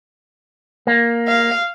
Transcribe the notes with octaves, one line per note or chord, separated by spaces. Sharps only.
A#3
F5